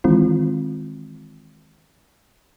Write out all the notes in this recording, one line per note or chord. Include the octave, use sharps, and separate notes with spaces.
D#3 E3 G#3 C4 F4